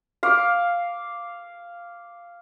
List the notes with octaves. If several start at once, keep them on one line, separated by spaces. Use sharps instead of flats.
F5 D6